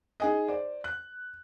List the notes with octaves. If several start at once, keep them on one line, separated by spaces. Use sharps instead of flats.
D#4 G#4 D#5
C5 D5
F#6